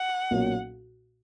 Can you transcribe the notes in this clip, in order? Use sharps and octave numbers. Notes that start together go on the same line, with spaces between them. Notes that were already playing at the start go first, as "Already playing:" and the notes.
Already playing: F#5
B1 A#2 F#3 A#3 C#4